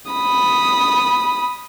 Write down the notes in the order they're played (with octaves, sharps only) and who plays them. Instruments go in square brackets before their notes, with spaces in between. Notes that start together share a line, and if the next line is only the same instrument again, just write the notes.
[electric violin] B5 D#6